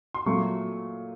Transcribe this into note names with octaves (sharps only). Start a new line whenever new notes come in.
C6
A#2 F#3 A3 C#6